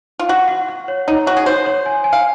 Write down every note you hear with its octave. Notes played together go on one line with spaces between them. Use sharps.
F4
F#4 F#5
F#5
F#5
C#5
D#4 C#5
F#4 C#5
G#4
C5 C#5
C#5
G#5
G#5
F5